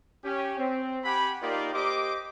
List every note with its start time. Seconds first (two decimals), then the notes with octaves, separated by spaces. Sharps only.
0.24 C#4 G4
0.57 C4
1.04 G4 F#5 G#5 B5
1.41 A#3 D#4 F4 G4 A#4 D5
1.73 A#3 G4 C5 D#5 D6